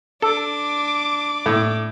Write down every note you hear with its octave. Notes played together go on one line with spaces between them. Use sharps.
D4 A4 D6
A2